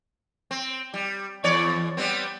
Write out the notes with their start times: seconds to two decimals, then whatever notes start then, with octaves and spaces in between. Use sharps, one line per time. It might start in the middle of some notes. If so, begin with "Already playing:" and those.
0.51 C4
0.94 G3
1.44 E2 C#5 D5
1.97 G3 B3 C4